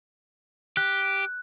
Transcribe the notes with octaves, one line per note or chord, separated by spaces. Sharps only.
G4 F#6